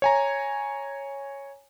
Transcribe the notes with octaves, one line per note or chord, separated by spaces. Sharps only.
C#5 G#5 A#5